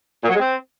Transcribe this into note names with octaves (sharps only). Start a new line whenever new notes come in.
A#2
F#3
G#3
C4